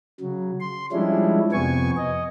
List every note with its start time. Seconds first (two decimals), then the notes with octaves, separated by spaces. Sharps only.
0.21 C#3 F#3
0.60 C6
0.92 F3 G3 G#3 C#4 D4 E4
1.52 F2 C3 B3 G#5 C#6
1.97 D#5